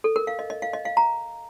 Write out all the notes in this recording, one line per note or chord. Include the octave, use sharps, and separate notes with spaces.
A4
A#4
F5
D#5
D#5
F5
D#5
F5
A#5